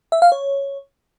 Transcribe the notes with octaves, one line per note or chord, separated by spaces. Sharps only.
E5
F5
C#5